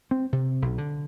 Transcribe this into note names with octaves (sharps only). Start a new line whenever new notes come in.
C4
C3
B1
D3